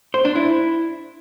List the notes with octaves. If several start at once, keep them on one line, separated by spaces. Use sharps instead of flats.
C5
D4
E4